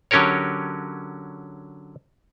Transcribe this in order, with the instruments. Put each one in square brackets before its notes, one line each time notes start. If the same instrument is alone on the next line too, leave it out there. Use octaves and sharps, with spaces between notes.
[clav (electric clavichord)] D3 F#3 C#4 G4 A#4 C#5